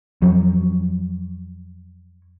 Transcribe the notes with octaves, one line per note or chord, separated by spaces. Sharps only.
F2 F#3